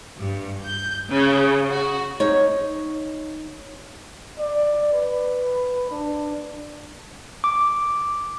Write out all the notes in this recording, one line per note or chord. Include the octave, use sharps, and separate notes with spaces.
G2
G6
C#3
F#4
D#4 C#5
D5
B4
D4
D6